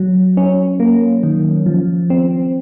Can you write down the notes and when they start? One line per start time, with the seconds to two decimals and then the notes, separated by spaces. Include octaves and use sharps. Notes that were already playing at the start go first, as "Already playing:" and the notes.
Already playing: F#3
0.37 C#4
0.80 A#3
1.23 D#3
1.66 F3
2.10 C4